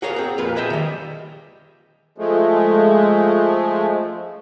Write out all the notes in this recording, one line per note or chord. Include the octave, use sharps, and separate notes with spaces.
F#4 G#4 A#4 C#5 F5
C4 G#4
F2 A#2 F4 B4
G#4 D#5 E5 G5
D#3 G3
F3 G#3 A3